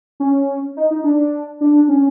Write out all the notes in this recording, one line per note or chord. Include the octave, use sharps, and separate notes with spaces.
C#4
D#4
D#4
D4
D4
C#4